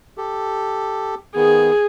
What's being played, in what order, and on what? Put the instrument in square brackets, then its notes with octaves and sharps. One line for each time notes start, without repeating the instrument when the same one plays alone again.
[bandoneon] G4 A4
[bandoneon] D#3 B3 [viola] G#4